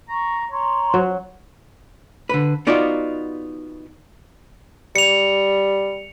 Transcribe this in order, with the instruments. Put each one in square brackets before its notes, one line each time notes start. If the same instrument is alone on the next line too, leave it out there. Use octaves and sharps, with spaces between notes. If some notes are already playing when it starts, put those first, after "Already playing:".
[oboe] A#5 [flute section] C#6
[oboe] C#5 [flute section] A#5 C6
[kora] F#3
[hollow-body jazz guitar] D3 B4
B3 D#4 F4 F#4 D5
[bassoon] G3 [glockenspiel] C#7 F7